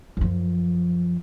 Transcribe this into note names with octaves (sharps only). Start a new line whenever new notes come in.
F#2 F3